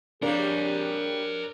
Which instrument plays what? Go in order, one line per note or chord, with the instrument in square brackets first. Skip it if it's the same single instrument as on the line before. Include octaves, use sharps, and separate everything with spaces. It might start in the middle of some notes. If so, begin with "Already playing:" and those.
[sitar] G3 A#3 [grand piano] D4 [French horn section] G4 G#4 [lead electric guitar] A#4 C#5